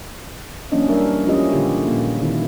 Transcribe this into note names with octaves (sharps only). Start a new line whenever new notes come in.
E3 F#3 A#3 C#4 D4 D#5
G3 D4 A#4 E5
F3 G#3 C#4 E4 G4 D#5
A#2 D3 D#3 F4 G4 E5
A#2 F3 A#3
D3 D#3 C4 E4